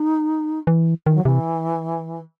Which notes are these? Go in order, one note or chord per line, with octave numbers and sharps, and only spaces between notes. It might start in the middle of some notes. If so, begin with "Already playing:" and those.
Already playing: D#4
E3
D#3 E3
F#3
C3 E3